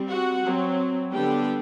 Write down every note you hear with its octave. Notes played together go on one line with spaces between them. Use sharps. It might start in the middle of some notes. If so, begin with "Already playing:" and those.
Already playing: G3 C4
F#4 F#5
F#3 C4
D3 G3 B3 D4 G4 G5